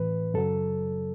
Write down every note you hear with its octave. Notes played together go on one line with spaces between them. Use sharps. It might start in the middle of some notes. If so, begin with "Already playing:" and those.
Already playing: A2 E3 B4
F#2 C#3 F#3 A4